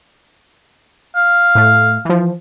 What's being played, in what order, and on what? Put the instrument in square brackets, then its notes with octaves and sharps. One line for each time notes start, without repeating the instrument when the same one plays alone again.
[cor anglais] F5
[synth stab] A2 A3
E3 F3